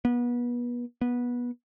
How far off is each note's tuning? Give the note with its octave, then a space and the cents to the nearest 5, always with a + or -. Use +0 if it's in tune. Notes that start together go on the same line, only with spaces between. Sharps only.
B3 -30
B3 -20